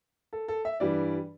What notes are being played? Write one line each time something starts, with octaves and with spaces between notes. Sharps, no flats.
A4
A4
E5
G2 E3 G3 D5